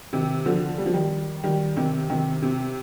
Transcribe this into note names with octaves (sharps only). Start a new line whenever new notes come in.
C3 D#3
D3 F3
G3
F3
D#3 G3
D#3 G3
C3 D#3
C3 D#3
C3